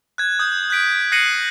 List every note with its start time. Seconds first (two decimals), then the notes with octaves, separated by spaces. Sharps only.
0.18 F#6 G#6
0.39 D#6 G6
0.70 F#6 G6 B6 D7
1.12 F#6 A#6 C7 C#7 D#7 F#7